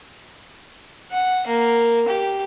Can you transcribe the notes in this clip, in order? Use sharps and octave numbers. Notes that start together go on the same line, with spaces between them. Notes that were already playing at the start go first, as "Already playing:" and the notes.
F#5
A#3
G4